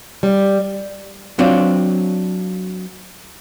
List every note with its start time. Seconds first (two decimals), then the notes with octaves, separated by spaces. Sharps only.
0.23 G3
1.39 F#3 C4 D4 F4